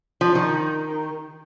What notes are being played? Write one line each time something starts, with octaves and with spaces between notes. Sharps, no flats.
F3
D#3